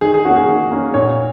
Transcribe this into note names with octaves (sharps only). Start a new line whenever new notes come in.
D#3 G#4
G#4
A#3 C#4 F#4
G#4
D#3
A#3 C#4
A#2 C#5